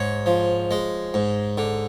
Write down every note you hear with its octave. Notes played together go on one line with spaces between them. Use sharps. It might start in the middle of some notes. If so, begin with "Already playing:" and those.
Already playing: G#2 C#5
F3
G#3
G#2
D3